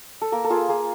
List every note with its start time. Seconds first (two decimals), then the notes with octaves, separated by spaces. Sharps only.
0.22 A4
0.32 A#3 A#4
0.44 A4
0.50 F4 G#4
0.68 A#3 G#4